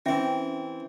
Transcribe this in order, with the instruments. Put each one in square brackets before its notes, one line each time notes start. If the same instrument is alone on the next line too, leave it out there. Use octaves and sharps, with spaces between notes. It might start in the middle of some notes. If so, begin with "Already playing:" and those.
[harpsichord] E3 C4 [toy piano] C#4 E5 G5 [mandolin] G4 D6